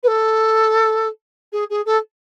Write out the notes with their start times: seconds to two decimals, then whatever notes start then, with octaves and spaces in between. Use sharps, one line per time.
0.03 B4
0.07 A4
1.52 G#4
1.70 G#4
1.86 A4